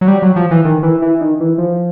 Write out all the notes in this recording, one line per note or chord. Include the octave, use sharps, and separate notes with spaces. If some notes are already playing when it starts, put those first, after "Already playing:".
F#3
G3
F#3
F3
E3
D#3
E3
E3
D#3
E3
F3